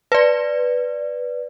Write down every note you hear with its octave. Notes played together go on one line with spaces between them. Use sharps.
B4 D5